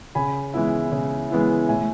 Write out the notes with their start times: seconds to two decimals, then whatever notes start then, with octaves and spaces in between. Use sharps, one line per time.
0.15 C#3 G#5 B5
0.54 E3 G#3 B3 E4
0.92 C#3
1.30 E3 G#3 B3 E4
1.69 A2 E5 G#5